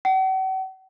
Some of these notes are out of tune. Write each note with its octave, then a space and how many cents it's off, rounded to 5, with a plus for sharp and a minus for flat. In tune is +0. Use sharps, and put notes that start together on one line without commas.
F#5 +45